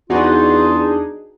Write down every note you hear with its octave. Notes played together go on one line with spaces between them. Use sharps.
E2 D4 D#4 F4 F#4 G#4 B4